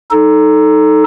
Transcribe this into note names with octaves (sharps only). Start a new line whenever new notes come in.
D#4 A4